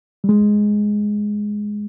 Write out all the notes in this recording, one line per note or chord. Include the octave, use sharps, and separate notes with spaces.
G3
G#3